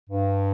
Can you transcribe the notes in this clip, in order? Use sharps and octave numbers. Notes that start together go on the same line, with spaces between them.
G2